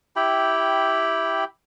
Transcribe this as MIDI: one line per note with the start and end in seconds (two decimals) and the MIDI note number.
0.16 1.44 64
0.16 1.44 67
0.16 1.44 79
0.16 1.44 83